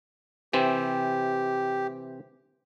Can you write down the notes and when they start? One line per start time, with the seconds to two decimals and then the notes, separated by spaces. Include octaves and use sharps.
0.53 C3 E3 C4 G4